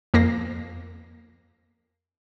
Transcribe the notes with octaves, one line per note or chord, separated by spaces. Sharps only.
F2 A#3 A#6 C7